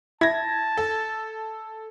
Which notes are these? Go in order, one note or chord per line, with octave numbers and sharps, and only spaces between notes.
E4 A5 G#6 A#6
A4